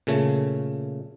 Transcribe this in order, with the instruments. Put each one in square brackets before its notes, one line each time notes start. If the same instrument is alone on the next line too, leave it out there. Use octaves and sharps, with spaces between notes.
[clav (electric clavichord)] A#2 C#3 A3